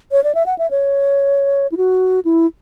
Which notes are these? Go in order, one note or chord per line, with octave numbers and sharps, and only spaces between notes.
C#5
D5
E5
F#5
E5
C#5
E4
F#4
E4